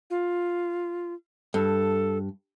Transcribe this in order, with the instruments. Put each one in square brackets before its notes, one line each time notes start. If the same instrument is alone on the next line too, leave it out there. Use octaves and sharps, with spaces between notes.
[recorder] F4
[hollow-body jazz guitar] G2 [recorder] A4